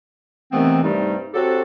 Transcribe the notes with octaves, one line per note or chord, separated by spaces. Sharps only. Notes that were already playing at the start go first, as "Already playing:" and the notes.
C3 D#3 E3 A3 B3 C4
G2 C3 G3 A3 D#4
F#3 C4 F#4 G4 A4